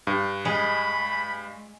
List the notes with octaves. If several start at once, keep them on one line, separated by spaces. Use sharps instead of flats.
G2
G#3 B5